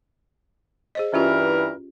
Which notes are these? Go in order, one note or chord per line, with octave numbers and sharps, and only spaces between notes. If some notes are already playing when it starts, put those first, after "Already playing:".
G#4 C5 D#5
G2 E3 C#4 F4 G4 A#4